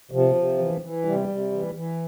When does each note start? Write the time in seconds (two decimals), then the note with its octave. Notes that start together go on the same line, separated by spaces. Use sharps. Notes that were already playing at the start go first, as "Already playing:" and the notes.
0.11 C3 F3
0.35 C3
0.58 E3
0.82 E3
1.05 C3 G3
1.28 C3
1.52 E3
1.75 E3